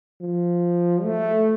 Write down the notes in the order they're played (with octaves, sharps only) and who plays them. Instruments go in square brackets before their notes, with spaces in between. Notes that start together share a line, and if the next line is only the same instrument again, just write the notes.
[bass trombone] F3
A3